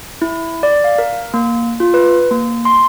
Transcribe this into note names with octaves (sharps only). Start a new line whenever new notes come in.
E4
D5
F5
A#4
A#3
F4
B4
A#3
C6